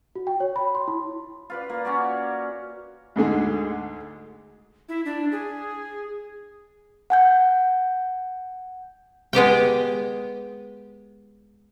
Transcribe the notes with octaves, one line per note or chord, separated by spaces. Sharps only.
F#4
G5
C#5
B5
C6
E4
F4 B4 D5
A#3
C#4 F#4 D5
D2 G#2 D3 G#3
E4
D4
G#4
F#5 G#5 G6
G#3 B3 G4 G5